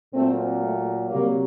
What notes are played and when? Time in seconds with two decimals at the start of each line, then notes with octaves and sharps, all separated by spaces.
0.14 A#2 F#3 A3 C4
0.62 A3
1.10 C3 F#3 G3 A#3